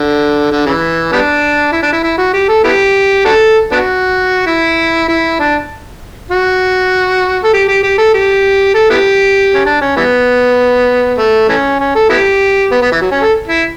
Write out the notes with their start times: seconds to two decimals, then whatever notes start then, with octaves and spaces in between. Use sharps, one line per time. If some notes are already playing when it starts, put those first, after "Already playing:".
Already playing: D3
0.51 D3
0.66 C#3 E3
1.12 G3 B3 D4
1.72 E4
1.83 D4
1.93 E4
2.03 E4
2.18 F#4
2.34 G4
2.49 A4
2.64 B3 E4 G4
3.25 D4 F#4 A4
3.72 B3 D4 F#4
4.47 E4
5.08 E4
5.39 D4
6.31 F#4
7.44 A4
7.53 G4
7.68 G4
7.83 G4
7.98 A4
8.14 G4
8.74 A4
8.90 B3 E4 G4
9.54 C#4
9.66 D4
9.81 C#4
9.96 E3 G3 B3
11.18 A3
11.48 E3 A3 C#4
11.80 C#4
11.95 A4
12.10 B3 E4 G4
12.71 B3
12.82 B3
12.92 E3
13.01 F#3
13.11 C#4
13.22 A4
13.48 E4